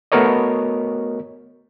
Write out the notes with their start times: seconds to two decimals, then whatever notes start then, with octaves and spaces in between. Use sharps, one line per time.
0.12 A3 B3 F#4 A#4 C#5 D#5